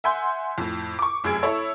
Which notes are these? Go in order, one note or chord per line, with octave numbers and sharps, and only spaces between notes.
E5 F#5 G#5 C6 G6
F2 A2
C#6 D6
F1 F#2 G#4 G#6 D7
E4 A4 C#5 E6